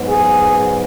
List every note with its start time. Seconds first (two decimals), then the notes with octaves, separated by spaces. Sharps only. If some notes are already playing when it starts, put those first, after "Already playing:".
Already playing: G#2 F#3 B3
0.09 G#4